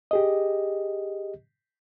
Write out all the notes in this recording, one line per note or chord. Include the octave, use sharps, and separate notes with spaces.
G4 G#4 D#5